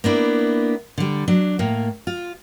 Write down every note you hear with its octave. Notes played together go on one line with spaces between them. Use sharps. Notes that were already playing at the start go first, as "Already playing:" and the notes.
A#3 B3 D4 E4
D3 G3
F#3 D4
A2 A#3
F4